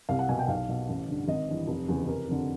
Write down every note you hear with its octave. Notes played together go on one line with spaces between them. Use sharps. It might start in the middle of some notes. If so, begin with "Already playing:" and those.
C2 F5
F#5
B2 G#5
G5
B1 F5
B2
A1
G2 D3
G#1 D#5
G2 E3
F1
E2 C#3 E3
F1 A#4
F2 D3